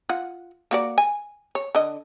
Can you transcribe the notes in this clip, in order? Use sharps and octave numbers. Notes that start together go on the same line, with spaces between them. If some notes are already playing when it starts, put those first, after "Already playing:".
F4 F#5
A#3 F#4 D5
G#5
C#5
D3 D#5